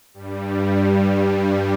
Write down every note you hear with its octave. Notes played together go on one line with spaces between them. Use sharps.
G2 G3